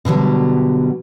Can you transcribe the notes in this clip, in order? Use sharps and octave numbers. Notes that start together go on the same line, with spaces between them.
B2 D3 F#3 G3